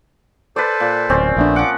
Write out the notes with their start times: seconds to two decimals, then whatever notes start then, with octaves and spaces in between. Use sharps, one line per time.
0.56 A4 B4 C5 D5
0.80 A#2
1.10 D1 C4 C#4 D5
1.37 A#1 A3 B3 D4
1.56 F3 F#5 D6